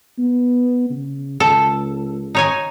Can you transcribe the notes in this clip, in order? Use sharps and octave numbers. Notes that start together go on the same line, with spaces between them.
B3
C#3
C#2 A4
D#4 C#5 G#5